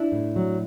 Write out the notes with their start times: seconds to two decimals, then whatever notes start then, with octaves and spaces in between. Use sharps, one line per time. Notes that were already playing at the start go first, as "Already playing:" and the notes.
Already playing: D4 E4
0.12 A2
0.36 F#3